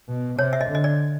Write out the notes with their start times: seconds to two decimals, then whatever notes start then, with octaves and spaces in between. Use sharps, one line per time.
0.08 B2
0.39 C3 C#5
0.53 E5
0.61 D#5
0.69 D3
0.75 D#5
0.84 D5